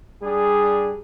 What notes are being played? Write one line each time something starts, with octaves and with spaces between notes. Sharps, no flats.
G3 D4 G#4